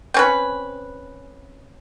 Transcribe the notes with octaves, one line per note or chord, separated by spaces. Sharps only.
C4 C#4 B4